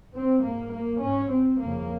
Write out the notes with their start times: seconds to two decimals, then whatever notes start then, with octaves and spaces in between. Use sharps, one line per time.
0.14 C4
0.43 G#2 A#3
0.73 A#3
1.02 G#2 C#4
1.31 C4
1.61 F2 A#3
1.66 C#3